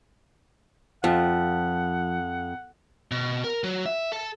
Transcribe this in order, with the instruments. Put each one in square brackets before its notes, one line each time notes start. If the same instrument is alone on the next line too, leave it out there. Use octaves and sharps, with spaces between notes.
[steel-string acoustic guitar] F2 [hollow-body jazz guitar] F3 [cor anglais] F#5
[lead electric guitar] B2
A#4
F#3
E5
A4